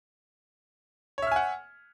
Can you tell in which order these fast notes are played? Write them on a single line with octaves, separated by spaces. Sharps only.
C#5 E5 F6 G#5 F#5